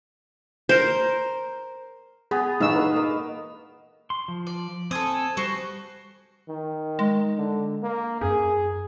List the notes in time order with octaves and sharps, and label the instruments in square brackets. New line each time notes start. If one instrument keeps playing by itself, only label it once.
[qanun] A#4 C5
[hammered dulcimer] B3 [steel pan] G#4
[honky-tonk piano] A#2 E3 [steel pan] D#4 E6 [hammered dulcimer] F5 C#6
[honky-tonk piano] G#4 B4
[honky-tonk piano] A#3 [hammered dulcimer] D#5
[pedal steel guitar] C6
F3
[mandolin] D5
[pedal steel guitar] C4 G#5 [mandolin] A4 D#6
[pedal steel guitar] G3 [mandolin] F#4 C5
[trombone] D#3
[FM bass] G#3
[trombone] D3
A#3
[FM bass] F#2 [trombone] G#4